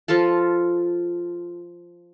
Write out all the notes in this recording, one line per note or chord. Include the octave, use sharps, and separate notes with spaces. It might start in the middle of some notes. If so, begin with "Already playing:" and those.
F3 F4 A4 A5